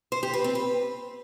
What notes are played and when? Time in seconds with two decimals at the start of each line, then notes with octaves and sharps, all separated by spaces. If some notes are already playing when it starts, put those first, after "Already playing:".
0.12 C5
0.23 G4
0.34 B4
0.44 C4
0.55 B4